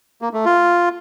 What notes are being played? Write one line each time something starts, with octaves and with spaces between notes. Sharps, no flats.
A#3
A3
F4